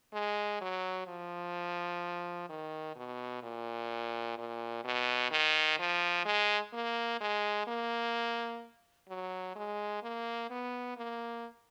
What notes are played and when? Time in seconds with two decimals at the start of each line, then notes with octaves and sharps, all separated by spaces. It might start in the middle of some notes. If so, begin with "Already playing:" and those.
0.14 G#3
0.61 F#3
1.07 F3
2.50 D#3
2.96 B2
3.43 A#2
4.38 A#2
4.85 B2
5.31 D#3
5.79 F3
6.26 G#3
6.73 A#3
7.21 G#3
7.68 A#3
9.09 F#3
9.56 G#3
10.03 A#3
10.51 B3
10.97 A#3